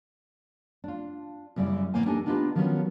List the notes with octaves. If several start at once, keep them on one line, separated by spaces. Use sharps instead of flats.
D4 F4
F#2 C#3 G3 E4 D5
A2 E3 A#3 B3 C5 G#5
D4 D#4 G4 A4 A#4 G#5
B3 D4 D#4 F4 G4 B4
D#3 F3 F#3 B3 C#4